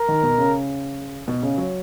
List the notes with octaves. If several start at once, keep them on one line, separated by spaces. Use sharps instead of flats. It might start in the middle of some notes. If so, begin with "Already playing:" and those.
Already playing: A#4
D#3
B2
C#3
B2
C#3
F#3